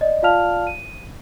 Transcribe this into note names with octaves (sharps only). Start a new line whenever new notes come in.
D5 D#5
F4 D5 F5 A5 F6 F7
D#7